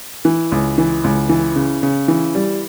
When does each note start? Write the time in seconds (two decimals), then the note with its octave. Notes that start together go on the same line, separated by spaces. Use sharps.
0.25 E3
0.52 C#2
0.78 E3
1.04 C#2
1.29 E3
1.56 C#3
1.83 C#3
2.08 E3
2.35 G3